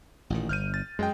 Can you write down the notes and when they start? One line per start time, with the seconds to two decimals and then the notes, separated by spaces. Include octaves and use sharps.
0.30 A1 A#2 D#3
0.49 G1 F6 G6 D#7
0.74 A6
0.99 F#2 G#3 D#5 G5